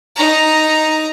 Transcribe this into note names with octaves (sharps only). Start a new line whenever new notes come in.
D#4 A#5